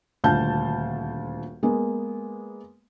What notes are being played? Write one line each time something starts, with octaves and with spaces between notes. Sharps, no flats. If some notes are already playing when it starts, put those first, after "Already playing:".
D#1 D2 F4 F5 A5 G6
G#3 A#3 B3